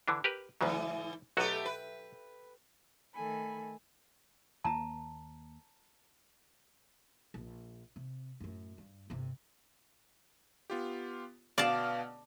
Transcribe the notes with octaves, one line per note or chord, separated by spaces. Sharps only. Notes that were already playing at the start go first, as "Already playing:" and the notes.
D3 E3 D4
G4 A#4 B4
D2 G#2 C#3 E3 F#3
B1 F#3 A3 B3 F#4 G4
B4
D#3 A3 A4 G#5 B5
D#2 A#3 A5 A#5
A#1
C3
F#2 A2
G2
G1 C3
B3 F4 G4
B2 B3 D5 F5 A5 F6